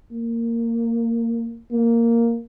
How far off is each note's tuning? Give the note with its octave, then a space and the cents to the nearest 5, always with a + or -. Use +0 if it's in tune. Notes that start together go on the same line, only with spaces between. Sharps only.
A#3 -15
A#3 -5